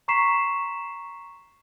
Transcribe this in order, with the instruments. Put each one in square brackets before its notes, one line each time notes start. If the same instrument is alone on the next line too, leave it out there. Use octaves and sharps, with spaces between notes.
[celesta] A#5 C6 C#6 B6 C7 E7